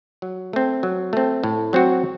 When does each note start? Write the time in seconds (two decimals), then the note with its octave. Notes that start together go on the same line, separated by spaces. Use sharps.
0.22 F#3
0.53 A3 C4
0.83 F#3
1.13 A3 C4
1.44 A2
1.73 F#3 C4 F#4